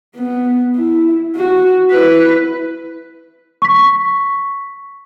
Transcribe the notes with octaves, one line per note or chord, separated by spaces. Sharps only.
B3
E4
F#4
E4 B4
C#6 B6